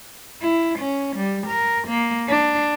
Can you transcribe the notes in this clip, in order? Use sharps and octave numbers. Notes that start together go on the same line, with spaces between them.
E4
C#4
G3
A#4
A#3
D4